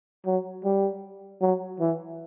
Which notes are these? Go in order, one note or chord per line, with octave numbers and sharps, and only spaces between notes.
F#3
G3
F#3
E3